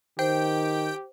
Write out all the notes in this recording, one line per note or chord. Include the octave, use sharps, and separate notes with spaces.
D#3 G4 C5 G5